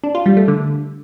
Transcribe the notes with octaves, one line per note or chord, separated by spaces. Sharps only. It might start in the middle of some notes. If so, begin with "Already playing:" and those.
D4
F4
G3
A3
D3